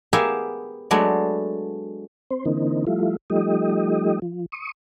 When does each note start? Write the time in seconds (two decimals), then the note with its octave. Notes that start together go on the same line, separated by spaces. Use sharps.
0.13 B3 G4 G#4 A#4 E5 F5
0.91 F#3 G#3 A3 B3 D4
2.31 C4 C5
2.45 D3 E3 A#3 C4 D#4
2.87 F3 G3 A3 E4 F4
3.30 F3 G3 A3 D#4 G4 D#5
4.22 F3
4.52 C#6 D#6